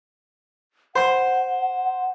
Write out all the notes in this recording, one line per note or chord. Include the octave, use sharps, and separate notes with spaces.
C5 F#5 C6